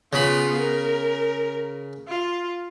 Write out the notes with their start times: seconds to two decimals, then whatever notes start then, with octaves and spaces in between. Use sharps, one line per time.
0.13 C#3 B3 F4 B5
0.58 A#4
2.08 F4